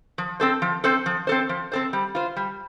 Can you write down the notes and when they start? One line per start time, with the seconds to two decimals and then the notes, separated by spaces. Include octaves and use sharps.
0.18 F3
0.40 C4 A4 C5
0.62 F3
0.84 C4 A4 C5
1.06 F3
1.27 C4 A4 C5
1.49 F3
1.72 C4 A4 C5
1.93 G3
2.15 F4 C5
2.36 G3